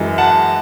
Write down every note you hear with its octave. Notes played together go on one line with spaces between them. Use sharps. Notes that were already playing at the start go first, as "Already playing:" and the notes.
Already playing: F#2 E3 G#3
F#5 A5